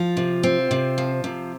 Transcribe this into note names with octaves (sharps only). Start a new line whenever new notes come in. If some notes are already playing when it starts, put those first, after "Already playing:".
Already playing: F3 F4
C3
C4
C3
F3
C3